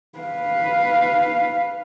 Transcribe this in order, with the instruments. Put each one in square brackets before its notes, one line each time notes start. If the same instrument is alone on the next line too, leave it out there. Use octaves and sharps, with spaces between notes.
[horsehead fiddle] B4 F5